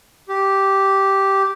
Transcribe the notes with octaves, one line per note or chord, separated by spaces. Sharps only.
G4